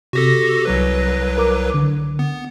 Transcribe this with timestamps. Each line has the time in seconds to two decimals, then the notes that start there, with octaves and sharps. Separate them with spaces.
0.13 C3 F#4 G4 A4 A#6
0.65 C2 F#3 B4
1.38 A#4 D6
1.74 D3
2.19 B3